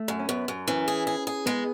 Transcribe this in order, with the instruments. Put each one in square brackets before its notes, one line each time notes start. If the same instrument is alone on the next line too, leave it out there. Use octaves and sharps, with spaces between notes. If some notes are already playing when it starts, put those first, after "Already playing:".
Already playing: [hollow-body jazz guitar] A3
[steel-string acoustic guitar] F#2
[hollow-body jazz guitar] C#4
[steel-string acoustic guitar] F#2 [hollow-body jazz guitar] B3
[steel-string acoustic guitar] F#2
[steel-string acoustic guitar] E3 [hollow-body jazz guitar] C#4
[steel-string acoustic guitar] G#4
G#4
G#4
[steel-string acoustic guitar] G#3 [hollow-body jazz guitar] B3